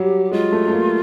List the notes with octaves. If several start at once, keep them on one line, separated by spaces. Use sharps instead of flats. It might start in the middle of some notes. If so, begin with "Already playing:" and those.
Already playing: F#3 G3 G4
G#3 F4
A3
A3
A#3